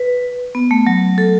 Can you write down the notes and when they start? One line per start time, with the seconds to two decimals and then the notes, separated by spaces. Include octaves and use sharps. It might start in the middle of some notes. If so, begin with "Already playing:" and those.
Already playing: B4
0.55 B3
0.71 A3
0.87 F#3
1.18 A4